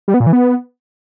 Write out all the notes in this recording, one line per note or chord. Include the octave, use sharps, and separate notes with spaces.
G3
B3
A#2
E3
B3